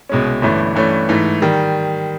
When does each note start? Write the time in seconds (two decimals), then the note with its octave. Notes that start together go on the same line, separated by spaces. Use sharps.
0.09 C2 B2 G#3 C#4
0.42 G1 G2 E3 A3 C#4
0.75 G2 E3 A3 C#4
1.09 G#2 E3 A3
1.42 D#3 G3